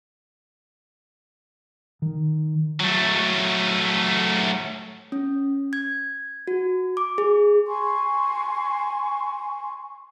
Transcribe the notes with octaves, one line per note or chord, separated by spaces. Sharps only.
D#3
F#3 A3
C#4
G#6
F#4
D6
G#4
G#5 C6 C#6